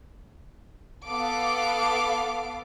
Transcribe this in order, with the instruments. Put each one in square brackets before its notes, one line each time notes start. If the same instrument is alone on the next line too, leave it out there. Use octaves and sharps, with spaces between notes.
[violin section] B3 A4 F5 D6